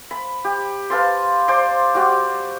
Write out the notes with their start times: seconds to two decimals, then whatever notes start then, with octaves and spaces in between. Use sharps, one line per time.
0.11 B5
0.45 G4
0.90 B4 F5 A5 C6
1.48 C5 D5 C6 D6
1.95 G3 F#4 D6